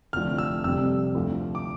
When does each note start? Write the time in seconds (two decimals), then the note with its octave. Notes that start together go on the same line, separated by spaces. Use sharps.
0.13 F1 F2 D3 F3 A3 F6
0.38 E6
0.64 F1 F2 C3 G3 E6
1.15 D2 D3 F3 A3
1.55 D6